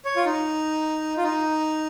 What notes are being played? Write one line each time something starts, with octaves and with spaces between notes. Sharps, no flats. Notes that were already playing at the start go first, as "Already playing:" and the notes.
C#5
F4
D#4
F4
D#4